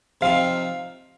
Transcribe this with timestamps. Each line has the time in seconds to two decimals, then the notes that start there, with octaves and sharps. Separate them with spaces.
0.21 C3 F3 C4 D#4 F5